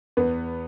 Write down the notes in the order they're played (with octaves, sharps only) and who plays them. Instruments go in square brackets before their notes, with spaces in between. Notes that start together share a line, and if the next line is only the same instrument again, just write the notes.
[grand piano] E2 [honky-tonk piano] B3